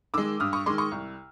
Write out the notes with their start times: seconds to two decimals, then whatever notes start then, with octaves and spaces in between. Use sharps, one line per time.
0.14 D#3 G#3 D6 E6
0.40 G2 D#6 F6
0.53 C#6 D#6
0.66 D#3 G#3 C6 D6
0.78 C#6 D#6
0.92 C2